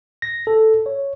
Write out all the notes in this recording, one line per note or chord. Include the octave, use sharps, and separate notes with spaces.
A#6
A4
C#5